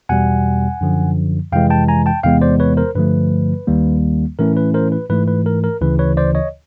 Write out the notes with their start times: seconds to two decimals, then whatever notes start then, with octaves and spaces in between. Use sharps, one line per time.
0.09 E2 B2 G3 F#5 G#5
0.81 F#2 D3 F3
1.52 F2 C3 E3 G#3 F5 G5
1.70 G5 A5
1.88 G#5 A#5
2.06 G5 A5
2.23 E2 C3 E3 G#3 B3 F5 G5
2.41 C5 D5
2.60 B4 C#5
2.77 A#4 C5
2.95 G2 D3 F3 A3 B4
3.67 D#2 D#3 G3 A#3
4.39 A2 E3 A3 C#4 E4 A#4
4.57 B4
4.74 A#4 C5
4.92 B4
5.10 G#2 E3 A3 B4
5.28 B4
5.46 A#4
5.64 A#4
5.81 D2 C#3 E3 B4
5.99 B4 C#5
6.17 C5 D5
6.35 C#5 D#5